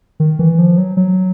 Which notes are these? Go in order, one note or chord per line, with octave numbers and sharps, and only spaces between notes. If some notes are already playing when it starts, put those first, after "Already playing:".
D#3
E3
F3
F#3
F#3